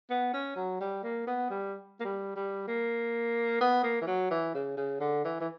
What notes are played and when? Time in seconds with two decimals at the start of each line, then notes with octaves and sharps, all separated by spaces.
0.10 B3
0.33 C#4
0.56 F#3
0.81 G3
1.03 A#3
1.27 B3
1.50 G3
2.00 A#3
2.05 G3
2.36 G3
2.67 A#3
3.61 B3
3.83 A#3
4.02 E3
4.07 F#3
4.31 E3
4.54 C#3
4.77 C#3
5.00 D3
5.25 E3
5.41 E3